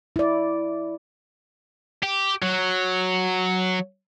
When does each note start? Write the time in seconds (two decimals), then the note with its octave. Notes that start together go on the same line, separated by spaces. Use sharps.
0.16 E4 D5
2.03 G4
2.42 F#3